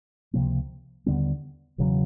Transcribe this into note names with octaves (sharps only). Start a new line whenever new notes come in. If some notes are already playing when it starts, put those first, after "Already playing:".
C#2 C3 F3 A#3
D#2 D3 G3 B3
E1 E2 C#3 F#3